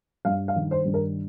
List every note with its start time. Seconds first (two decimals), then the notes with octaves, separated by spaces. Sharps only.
0.25 G2 F5
0.48 F5
0.56 D#3
0.71 C5
0.85 G2
0.94 A#4